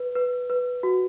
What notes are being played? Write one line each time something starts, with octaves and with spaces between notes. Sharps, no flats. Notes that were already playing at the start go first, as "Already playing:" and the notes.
Already playing: B4
B4
B4
F#4